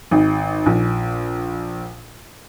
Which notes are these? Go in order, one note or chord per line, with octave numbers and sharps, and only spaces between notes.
G#1
A#1